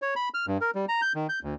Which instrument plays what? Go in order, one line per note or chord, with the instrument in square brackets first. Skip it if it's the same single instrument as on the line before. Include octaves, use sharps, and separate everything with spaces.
[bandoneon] C#5
B5
F6
G2
A#4
G3
A#5
G6
D#3
G6
D2